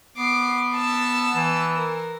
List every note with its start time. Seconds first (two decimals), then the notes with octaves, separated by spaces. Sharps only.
0.18 B3 D6 C7
0.75 A5 E6
1.36 E3
1.75 A#4